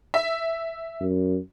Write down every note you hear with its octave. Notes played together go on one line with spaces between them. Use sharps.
E5
F#2